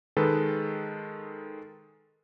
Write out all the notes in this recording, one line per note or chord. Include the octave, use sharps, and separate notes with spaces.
D#3 G#3 A4 B4